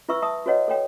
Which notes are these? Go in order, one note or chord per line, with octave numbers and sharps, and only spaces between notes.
E4 B4 E5 C#6 E6
E5 A5 D#6
F#4 B4 C#5 D#5 F#5
A4 C#5 G5